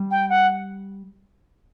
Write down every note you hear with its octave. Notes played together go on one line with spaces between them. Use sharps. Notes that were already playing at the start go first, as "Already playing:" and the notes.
Already playing: G3
G5
F#5